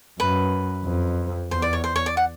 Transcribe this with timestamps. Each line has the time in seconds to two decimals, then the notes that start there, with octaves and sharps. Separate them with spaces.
0.20 F#2 B4
0.85 F2
1.51 E2 C5
1.62 D5
1.73 C#5
1.84 C5
1.96 C#5
2.06 D5
2.17 F#5